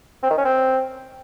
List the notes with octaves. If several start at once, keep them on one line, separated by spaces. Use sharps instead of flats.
C4
D#3
C#4
C4